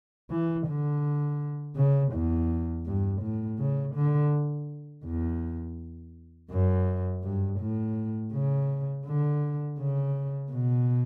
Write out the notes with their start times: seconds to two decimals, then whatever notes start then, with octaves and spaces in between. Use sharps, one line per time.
0.31 E3
0.67 D3
1.76 C#3
2.13 E2
2.86 G2
3.22 A2
3.59 C#3
3.95 D3
5.05 E2
6.51 F#2
7.23 G2
7.60 A2
8.33 C#3
9.06 D3
9.79 C#3
10.52 B2